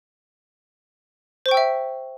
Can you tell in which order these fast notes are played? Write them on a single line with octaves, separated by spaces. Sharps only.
C5 C#6 G5 E6 E5